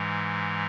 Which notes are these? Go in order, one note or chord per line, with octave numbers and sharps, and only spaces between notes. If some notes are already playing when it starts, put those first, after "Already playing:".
Already playing: G#2 E3 G#3